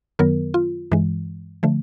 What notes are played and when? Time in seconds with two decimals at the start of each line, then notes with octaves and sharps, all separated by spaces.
0.19 F#2 D#3 F#3 B3 A#4
0.54 F4
0.92 G2 E3 G#3
1.63 D3 F3 A3